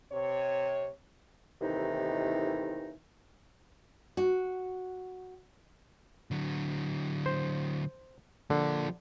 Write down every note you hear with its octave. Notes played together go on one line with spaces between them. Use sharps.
C3 C#5
D#2 A2 C3 D#3 E3 D#4
F#4
D3 F#3
C5
D3 F3 A#3